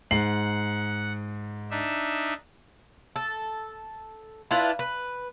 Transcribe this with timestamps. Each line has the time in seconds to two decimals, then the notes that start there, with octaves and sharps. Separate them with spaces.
0.11 G#2 F#5 C7 F#7
1.71 D4 D#4 E5
3.16 A4
4.51 D4 E4 F4 B4
4.79 B4